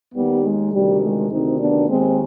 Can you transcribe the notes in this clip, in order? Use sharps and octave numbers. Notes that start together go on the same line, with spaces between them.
D#2 D#3 G3 B3
G#3
D2 C3 D#3 G3
G#3
D2 C3 D#3 C4 D#4
B3 D4
D#2 D#3 G#3 C4